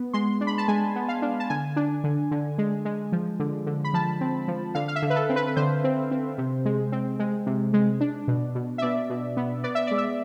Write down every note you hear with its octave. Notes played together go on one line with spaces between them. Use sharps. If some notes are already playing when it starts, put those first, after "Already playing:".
Already playing: B3
G#3 C6
D4
B5
A5
G#3 G#5
B3
F5
D4
A5
D3 G#5
D4
D3
D3
G#3
G#3
F3
D3
D3
B5
F3 A5
C4
F3
D3 F5
F5
E5
D3
B4
A4
C4
B4
B4
D3 C5
C4
C4
C3
G#3
C4
G#3
C3
G#3
D4
B2
B2
E5
B2 D5
B2
B3
B3 D5
E5
G#3 D5
E5